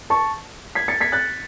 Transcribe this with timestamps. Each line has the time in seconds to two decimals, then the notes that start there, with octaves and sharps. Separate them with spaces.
0.10 A5 C#6
0.75 G#6 B6
0.88 A6 C#7
1.01 G#6 B6
1.12 F#6 A6